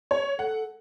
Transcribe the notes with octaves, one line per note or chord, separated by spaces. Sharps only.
C#5
A4 F#5